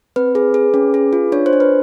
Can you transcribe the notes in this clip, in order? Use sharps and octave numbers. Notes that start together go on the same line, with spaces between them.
C4 B4
G#4
G#4
C#4
G#4
F4
D4 C#5
C5
D4
B4